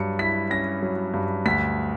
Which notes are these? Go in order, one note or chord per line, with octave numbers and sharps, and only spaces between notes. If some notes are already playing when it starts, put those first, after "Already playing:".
Already playing: G2 F#3 C#7
E4 B6
C#4 A#6
F#3
G2
D2 B6